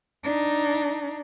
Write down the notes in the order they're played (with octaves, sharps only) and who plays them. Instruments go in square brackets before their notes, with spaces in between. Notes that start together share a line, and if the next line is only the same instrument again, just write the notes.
[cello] D4 D#4